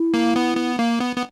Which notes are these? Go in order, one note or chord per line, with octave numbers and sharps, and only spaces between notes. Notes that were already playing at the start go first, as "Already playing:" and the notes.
Already playing: E4
A#3
B3
B3
A#3
B3
B3